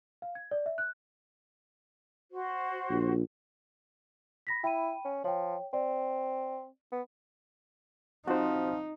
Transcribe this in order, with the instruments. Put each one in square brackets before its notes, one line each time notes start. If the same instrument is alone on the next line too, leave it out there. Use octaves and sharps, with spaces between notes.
[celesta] F5
G#6
D5
E5
F#6
[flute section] F#4 C5
[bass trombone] A#1
[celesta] B5 A#6 B6
[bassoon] E4 [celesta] G5 B5 D#7
[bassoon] C#4
[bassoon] F3 [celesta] C#5 G5
[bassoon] C4 [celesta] D5
[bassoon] B3
[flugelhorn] F3 [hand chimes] C4 F4 [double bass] D#4 [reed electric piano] F#4 C5